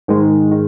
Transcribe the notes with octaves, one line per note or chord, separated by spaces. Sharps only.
G#2 D#3 G#3
D#3